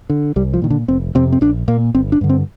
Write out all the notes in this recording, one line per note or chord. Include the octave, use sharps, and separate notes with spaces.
D3
C2 G3
F3
A#2 D#3
D3
F1 C4
F2 C3 C4
C4
A#1 D4
A#2 A#3
G1 C4
D4
G2 D3
C4